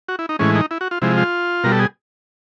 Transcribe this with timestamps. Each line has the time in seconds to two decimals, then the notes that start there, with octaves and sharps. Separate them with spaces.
0.08 F#4
0.19 E4
0.29 D#4
0.39 A2 E3 G#3 C#4
0.55 D#4
0.71 E4
0.81 F#4
0.91 F4
1.02 C3 F3 G#3 E4
1.17 F4
1.64 B2 G3 A#4
1.72 A4
1.79 G#4